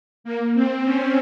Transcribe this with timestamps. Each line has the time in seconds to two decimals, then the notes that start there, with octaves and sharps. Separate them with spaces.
0.24 A#3
0.54 C4
0.84 C#4